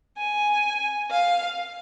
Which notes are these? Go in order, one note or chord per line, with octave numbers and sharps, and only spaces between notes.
G#5
F5